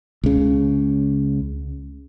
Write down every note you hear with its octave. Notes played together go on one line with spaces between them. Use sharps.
C#2 C#3